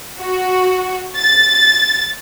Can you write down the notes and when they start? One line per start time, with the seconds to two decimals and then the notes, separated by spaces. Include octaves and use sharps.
0.21 F#4
1.18 A6